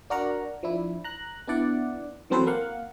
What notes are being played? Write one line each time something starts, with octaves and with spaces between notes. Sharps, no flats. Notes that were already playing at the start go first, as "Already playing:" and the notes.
D4 F#4 A#4 F#5 A#5
F3 D4 E4
A#5 F#6
B3 D4 E4 D5 F#5
E3 F#3 C4 A4 B4 C5
A#3 F5 F#5